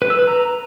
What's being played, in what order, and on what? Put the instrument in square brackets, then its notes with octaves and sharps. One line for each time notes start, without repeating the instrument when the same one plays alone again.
[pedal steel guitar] B4
E6
B4
A#5